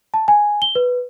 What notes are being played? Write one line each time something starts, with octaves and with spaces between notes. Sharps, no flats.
A5
G#5
G7
B4